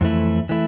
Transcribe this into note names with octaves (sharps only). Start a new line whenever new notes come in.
F2 E3 A3 E4
E3 A3 E4